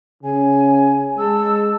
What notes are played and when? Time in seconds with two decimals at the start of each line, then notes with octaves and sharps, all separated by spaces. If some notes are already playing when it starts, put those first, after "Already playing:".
0.23 C#3 G#5
1.18 G#3 A5 E6